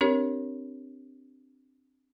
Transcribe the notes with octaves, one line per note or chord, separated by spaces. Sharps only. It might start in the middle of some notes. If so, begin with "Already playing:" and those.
C4 D4 G4 A#4 C#5